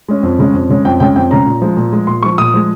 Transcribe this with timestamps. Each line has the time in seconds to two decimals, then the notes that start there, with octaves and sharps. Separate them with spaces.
0.09 G#3 C#4
0.23 F2
0.39 C#3 G#3 C#4
0.54 F2
0.70 C#3 G#3 C#4
0.85 F2 G5
1.00 C#3 G#3 C#4 G5
1.16 F2 G5
1.31 C#3 G#3 C#4 A#5
1.46 A#2
1.62 F3 G#3
1.77 A#2
1.93 F3 G#3
2.07 A#2 C6
2.23 F3 G#3 C#6
2.38 A#2 D#6
2.54 F3 G#3